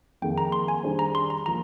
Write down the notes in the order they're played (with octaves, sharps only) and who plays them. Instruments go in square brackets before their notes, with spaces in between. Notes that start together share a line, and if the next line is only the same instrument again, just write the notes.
[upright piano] F2 D#3 A#3 D#4 G#4 [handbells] G5
[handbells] A#5
C6
G#5
[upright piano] D#3 G3 D4 G#4 C5
[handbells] A#5
C6
A#5
[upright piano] F3 A#3 [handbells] A#5